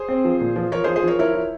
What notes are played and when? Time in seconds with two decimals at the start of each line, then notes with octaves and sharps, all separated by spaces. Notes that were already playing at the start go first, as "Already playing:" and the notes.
Already playing: G#4 C5
0.09 C4
0.24 F3
0.41 A#2
0.56 F3
0.72 F3 A#4 C#5
0.84 G#4 C5
0.87 F3
0.96 G#4 C5
1.04 F3 A#4 C#5
1.19 E4 A#4 C#5
1.35 E4